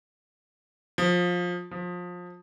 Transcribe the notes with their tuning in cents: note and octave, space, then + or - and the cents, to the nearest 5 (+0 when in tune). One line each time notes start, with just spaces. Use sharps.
F3 +20
F3 +25